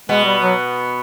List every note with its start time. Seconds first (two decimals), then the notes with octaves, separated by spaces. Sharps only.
0.09 B2 G#3 B3
0.25 G3
0.42 F#3